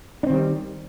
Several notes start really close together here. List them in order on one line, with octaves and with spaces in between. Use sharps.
D4 C4 D#3 G3